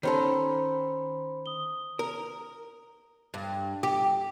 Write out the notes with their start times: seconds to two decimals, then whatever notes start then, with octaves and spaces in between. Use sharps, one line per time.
0.03 D#3 C#4 A4 C5 B5 C6
1.46 D#6 G7
1.99 A#4
3.34 G2
3.83 G4